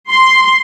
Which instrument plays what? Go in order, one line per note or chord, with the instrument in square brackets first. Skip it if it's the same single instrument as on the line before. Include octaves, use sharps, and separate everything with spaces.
[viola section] C6